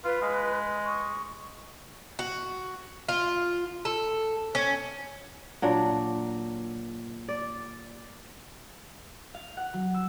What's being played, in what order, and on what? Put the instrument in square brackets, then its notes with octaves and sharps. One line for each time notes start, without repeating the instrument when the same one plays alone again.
[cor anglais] F4 [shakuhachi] B4
[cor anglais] G#3
[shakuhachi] C#6
[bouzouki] F#4
F4
A4
C#4
[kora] A#2 F#3 D4
D5
[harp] F5
F#5
F#3
E6